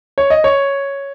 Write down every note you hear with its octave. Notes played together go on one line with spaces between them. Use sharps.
C#5
D#5
C#5